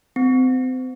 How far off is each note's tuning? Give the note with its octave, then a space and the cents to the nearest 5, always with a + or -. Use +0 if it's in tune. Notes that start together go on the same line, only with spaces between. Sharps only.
C4 -30